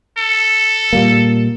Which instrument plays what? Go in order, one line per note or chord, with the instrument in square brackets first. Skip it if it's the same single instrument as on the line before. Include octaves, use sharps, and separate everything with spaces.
[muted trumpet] A4
[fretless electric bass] A#2 G3 A#3